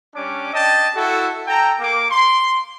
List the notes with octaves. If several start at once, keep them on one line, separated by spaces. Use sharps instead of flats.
G3 C#4 D4 D6
D4 D#5 G5 A5
E4 F#4 A4
A4 G5 A#5
A#3 D6
C6